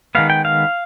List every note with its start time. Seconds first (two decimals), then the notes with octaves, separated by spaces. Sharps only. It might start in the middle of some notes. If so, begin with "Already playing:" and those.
0.15 D#3 G#3 B3 F5
0.30 G5
0.45 F5